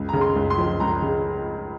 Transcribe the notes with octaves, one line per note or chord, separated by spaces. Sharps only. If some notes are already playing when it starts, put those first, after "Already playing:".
Already playing: C#2
C#3 A#5
C6
C#2
C6
F3
C#2 A#5
C#3